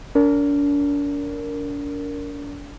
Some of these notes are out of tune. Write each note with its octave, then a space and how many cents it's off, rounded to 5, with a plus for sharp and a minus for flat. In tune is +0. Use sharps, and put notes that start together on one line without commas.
D4 -40 A#4 -10